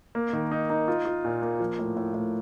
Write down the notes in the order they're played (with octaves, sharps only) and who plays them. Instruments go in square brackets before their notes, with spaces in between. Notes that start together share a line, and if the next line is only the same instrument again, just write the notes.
[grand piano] A#3
D#3
D#4
D#4
F4
F4
A#2
A#3
F3
A2
A2
A2